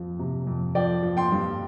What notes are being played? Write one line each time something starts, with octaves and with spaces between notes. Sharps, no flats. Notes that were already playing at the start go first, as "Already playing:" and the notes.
Already playing: F2 F3
C3
F2
F3 D5 G5
F3
G5 C6
G2